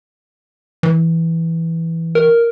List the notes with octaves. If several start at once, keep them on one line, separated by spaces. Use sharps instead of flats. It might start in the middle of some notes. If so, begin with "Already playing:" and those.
E3
A#4